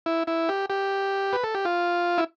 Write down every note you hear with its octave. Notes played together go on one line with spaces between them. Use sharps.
E4
E4
G4
G4
B4
A4
G4
F4
E4